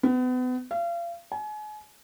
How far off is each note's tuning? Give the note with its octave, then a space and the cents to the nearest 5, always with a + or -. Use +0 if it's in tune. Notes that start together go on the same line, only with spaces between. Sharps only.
B3 +35
F5 -35
G#5 +35